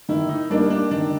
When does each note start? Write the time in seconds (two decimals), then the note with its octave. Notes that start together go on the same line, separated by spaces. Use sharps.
0.09 D#3 E4
0.29 D#4
0.50 G3 A#3 D4 D#4
0.70 D4
0.91 D#3 D4